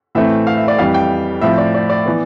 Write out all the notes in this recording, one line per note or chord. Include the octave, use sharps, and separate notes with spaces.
A2 E3 A3 C4 E5
F5
E5
D5
F2 E3 G3 F5
G5
A2 F3 C4 E5
D5
D5
D5
E3 B3